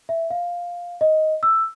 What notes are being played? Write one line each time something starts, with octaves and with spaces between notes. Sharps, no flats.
E5
F5
D#5
E6